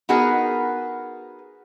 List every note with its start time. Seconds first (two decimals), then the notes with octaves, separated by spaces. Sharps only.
0.09 B3 D#4 F#4 G#4 A#4 B4